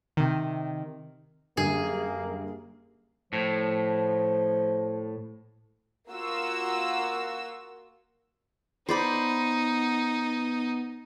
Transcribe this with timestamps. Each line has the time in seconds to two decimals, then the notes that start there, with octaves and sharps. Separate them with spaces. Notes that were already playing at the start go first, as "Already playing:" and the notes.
0.17 C3 D#3
1.57 F#2 D3 G3 A#3 G#4
3.33 A2 F3
6.10 A#3 F4 F#4 E6
8.89 B3 D#4 C5 D5 B5